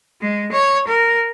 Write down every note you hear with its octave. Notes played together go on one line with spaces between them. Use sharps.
G#3
C#5
A#4